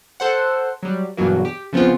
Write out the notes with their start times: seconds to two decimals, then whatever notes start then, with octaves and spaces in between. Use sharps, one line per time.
0.20 A4 C5 F#5
0.83 F#3 G3
1.17 E2 G2 B2 F#3 A#3
1.45 G4
1.73 C#3 F3 B3 C4 F4